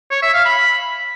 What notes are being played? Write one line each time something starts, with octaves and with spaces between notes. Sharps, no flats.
C#5
E5
F5
B5